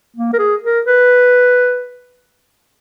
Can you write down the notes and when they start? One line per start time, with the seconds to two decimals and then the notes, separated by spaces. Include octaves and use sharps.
0.16 A#3
0.33 A#4
0.39 G#4
0.63 A#4
0.86 B4